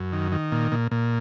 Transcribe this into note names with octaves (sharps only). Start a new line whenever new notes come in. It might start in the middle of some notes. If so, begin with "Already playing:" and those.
Already playing: F#2
D#3
D#3
A#2
A#2
A#2